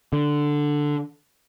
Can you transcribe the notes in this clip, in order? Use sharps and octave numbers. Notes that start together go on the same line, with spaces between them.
D3